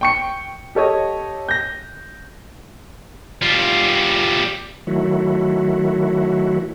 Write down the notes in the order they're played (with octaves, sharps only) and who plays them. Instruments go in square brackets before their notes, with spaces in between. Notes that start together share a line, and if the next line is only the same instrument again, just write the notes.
[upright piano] G5 C#6 C#7
G4 A4 C#5 D#5
G6 A#6
[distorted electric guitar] G3 F4
[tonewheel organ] D#3 F#3 A3 E4 F#4